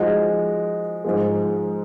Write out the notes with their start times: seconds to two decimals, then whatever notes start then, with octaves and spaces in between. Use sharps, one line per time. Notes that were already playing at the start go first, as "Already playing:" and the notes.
Already playing: F3 G#3 D#4 F#4
1.04 G#2 F3 G#3